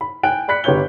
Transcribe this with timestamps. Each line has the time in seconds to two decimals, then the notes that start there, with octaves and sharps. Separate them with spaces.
0.01 B5
0.23 G5 G#5 F#6 D7
0.48 D5 B5 F#6 B6 C#7
0.64 G1 G4 B4 C#5 G6 G7